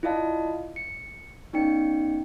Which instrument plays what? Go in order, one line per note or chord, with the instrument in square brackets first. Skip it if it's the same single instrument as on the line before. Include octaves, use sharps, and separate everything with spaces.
[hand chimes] E4 F4 D5 D#5 F5 A5
C#7
B3 C#4 D#4 D5 G5 C#7